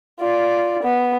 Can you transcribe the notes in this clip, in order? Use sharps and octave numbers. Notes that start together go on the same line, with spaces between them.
F4 D5
B3